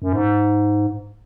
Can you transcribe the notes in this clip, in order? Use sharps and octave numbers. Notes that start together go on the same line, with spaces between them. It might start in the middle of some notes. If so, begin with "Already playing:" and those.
F#2
G#2